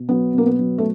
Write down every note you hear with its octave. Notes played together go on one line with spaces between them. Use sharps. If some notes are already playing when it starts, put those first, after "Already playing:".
Already playing: B2
F#3 B3
B2 A#3
B3
F#3
A3